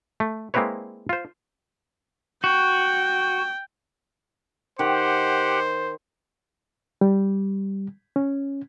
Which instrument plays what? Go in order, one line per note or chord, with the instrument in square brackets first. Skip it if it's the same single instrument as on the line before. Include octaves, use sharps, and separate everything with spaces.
[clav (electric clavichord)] A3
G#3 A#3 C4 E4 B4 C#5
F4 C5
[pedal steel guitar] F#4 [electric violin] G5
[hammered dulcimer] D#3 [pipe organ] G4 F#5 [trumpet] C5
[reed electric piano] G3
C#4